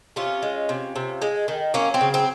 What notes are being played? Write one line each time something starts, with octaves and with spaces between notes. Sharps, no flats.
C3 C#4 F4
G#3
C3
C3
G#3
D#3
F#3 A#3 C#4
C4
C#3
C4